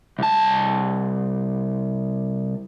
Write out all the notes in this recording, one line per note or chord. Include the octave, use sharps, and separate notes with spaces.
C2 A5